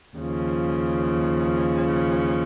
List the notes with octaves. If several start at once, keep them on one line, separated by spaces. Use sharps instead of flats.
D#2 C#3 F3